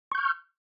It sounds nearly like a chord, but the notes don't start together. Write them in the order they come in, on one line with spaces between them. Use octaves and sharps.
C#6 G6 F6